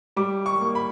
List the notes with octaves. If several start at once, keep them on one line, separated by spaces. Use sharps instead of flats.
G3 D6
C#6
A#3
B5